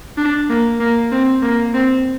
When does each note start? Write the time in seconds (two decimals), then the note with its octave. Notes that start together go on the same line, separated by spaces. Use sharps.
0.17 D4
0.50 A#3
0.80 A#3
1.12 C4
1.43 A#3
1.74 C4